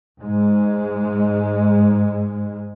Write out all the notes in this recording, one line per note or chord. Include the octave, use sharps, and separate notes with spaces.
G#2 G#3